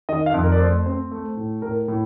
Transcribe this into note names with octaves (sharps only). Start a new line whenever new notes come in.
D#3 D#5
F5
F2
A#4
D5
A3 C5
C4
A3
A2
A2 A#4
A2